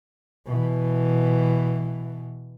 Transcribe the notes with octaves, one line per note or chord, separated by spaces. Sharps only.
B2 E3